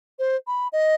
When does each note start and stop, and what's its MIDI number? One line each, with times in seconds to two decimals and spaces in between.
0.19 0.36 72
0.47 0.68 83
0.73 0.95 75